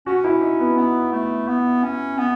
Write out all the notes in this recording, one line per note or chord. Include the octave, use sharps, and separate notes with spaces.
C#4 F#4
E4
D#4
B3
B3
A3
B3
C#4
B3